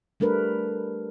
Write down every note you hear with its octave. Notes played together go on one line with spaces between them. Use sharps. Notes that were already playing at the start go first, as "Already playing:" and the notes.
G3 A3 D4 A#4 B4